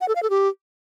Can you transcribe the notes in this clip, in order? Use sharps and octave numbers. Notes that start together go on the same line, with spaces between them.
F#5
A4
F5
A4
G4